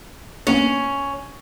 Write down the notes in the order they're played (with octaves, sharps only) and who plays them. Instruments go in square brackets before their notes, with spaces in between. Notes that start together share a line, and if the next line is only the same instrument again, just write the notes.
[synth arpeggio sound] C2 A#3 B3 [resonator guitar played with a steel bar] C#4